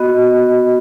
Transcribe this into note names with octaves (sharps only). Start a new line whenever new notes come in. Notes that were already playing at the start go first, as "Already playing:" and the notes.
Already playing: B3 F#4 D#5